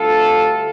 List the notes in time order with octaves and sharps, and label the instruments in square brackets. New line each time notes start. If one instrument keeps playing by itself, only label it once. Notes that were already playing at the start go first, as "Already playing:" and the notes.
Already playing: [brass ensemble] D2 D3 G3 F4 A4